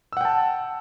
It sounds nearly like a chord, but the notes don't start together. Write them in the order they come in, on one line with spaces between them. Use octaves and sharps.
E6 F#5 G5 A5